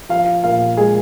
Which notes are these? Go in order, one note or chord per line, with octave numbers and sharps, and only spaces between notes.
F3 F5
A#2 F5
G#3 G#4